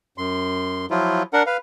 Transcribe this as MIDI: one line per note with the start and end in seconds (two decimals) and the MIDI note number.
0.18 0.86 42
0.18 0.86 84
0.90 1.23 53
0.90 1.23 54
0.90 1.23 64
0.90 1.23 65
1.33 1.43 62
1.33 1.43 70
1.33 1.43 78
1.46 1.57 71
1.46 1.57 77